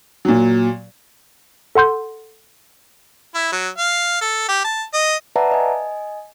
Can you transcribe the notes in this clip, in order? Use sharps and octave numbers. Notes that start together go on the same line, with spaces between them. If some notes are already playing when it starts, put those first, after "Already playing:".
A#2 F#3
A4 F#5 C6 G6
E4
F#3
F5
A4
G4
A5
D#5
B4 D5 E5 F#5 A5 A#5
D#5 G#5